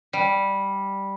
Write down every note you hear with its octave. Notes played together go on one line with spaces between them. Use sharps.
G3